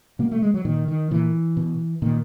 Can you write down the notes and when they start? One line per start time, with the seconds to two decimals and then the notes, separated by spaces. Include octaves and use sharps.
0.19 B2 A#3
0.31 A3
0.42 G#3
0.54 F#3
0.65 A#2 D#3
0.88 D#3
1.11 A#2 E3
1.57 B2
2.02 A#2 D#3